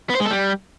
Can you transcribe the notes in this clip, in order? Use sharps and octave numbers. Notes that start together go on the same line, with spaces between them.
B3
C5
G#3
A4
G3